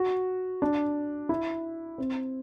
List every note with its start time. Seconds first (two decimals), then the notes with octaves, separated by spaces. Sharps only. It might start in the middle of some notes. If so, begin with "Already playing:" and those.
Already playing: F#4
0.62 D4
1.29 E4
1.98 C4